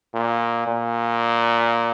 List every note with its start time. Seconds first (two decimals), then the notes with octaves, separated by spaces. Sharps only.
0.14 A#2
0.67 A#2